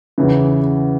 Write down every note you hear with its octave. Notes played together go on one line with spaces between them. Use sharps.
E2 C#3 E3